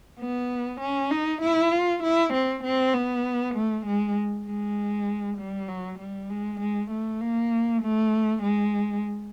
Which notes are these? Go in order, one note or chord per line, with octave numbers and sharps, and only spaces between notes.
B3
C#4
D#4
E4
F4
E4
C4
C4
B3
A3
G#3
G#3
G3
F#3
G3
G#3
G#3
A3
A#3
A3
G#3